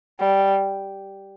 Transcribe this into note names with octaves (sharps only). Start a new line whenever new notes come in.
G3